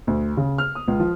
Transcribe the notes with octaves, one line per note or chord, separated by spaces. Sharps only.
D2
C#3
F6
D#6
C#2
F3